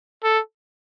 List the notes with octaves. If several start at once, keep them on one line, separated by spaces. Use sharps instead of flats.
A4